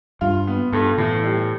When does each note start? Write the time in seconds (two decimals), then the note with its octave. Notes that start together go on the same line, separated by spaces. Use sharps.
0.21 G2 F4
0.47 B3
0.73 G2 A4
0.98 A2 E3
1.24 G3